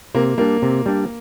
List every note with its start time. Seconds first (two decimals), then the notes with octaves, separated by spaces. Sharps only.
0.15 C3 A#3
0.38 G3 A#3 D4
0.62 C3
0.86 G3 D4